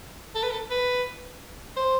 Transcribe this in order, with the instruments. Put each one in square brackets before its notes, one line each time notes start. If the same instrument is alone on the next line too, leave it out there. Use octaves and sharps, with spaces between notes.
[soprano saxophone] A4
B4
A4
B4
C5